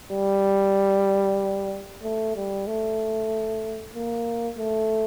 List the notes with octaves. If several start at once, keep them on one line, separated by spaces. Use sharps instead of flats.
G3
A3
G3
A3
A#3
A3